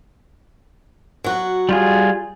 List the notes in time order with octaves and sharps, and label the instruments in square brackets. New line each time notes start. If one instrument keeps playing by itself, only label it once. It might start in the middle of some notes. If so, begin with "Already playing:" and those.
[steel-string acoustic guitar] F#3 F#4
[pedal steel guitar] G3 F4 G#4